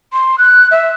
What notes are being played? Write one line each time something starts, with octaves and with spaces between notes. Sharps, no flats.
C6
F#6
E5